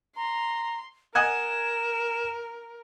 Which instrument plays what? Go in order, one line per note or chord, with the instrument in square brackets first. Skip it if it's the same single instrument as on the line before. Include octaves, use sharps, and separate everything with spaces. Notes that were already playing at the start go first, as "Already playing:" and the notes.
[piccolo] A#5 [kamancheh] C6
[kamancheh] A#4 [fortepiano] D#5 F#5 G#5 [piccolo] E7